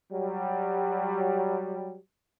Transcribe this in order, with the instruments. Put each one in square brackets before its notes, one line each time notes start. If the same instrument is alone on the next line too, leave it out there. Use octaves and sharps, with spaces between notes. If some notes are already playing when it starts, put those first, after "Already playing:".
[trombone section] F#3 G3